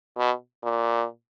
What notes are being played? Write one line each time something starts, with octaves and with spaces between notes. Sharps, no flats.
B2
A#2